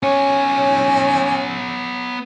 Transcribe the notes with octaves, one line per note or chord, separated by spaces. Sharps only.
B3 C#4 C#5